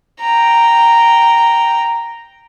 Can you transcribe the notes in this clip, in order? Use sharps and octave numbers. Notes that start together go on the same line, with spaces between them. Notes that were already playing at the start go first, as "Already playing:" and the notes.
G5 A#5